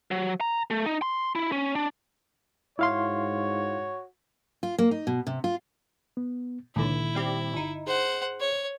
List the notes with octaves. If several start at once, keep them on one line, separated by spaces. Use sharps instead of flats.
F#3
A#5
A3
D#4
C6
E4
C#4
D4
G#2 E4 F#4 C#5 F5 C6
F4
A#3
D#4
B2
C3
F4
B3
C#2 A#2 D3 D#3 E4
G3 C4 G4
G1 D#4
G#4 C5 F#5
C#5